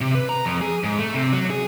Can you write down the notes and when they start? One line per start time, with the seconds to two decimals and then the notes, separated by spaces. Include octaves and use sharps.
0.01 C3
0.15 B4
0.29 A#5
0.45 F2
0.61 G#4
0.84 G#2
0.99 A3
1.14 C3
1.33 F#3
1.50 G#4